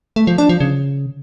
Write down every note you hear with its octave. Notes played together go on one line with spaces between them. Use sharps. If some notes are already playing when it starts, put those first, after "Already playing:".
A3
F3
D4
F3
C#3